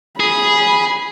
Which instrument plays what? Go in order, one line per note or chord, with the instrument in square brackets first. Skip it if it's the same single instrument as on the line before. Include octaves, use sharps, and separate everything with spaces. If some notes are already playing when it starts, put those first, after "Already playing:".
[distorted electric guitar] G#4 [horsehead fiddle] B5